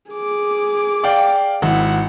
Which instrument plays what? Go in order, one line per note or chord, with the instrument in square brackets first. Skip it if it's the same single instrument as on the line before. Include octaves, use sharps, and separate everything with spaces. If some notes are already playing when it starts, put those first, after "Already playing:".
[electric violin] G#4 D6
[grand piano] D5 F5 G5
[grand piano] G#1 E4 [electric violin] F#5